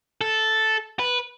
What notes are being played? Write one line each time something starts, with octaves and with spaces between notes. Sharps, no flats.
A4
B4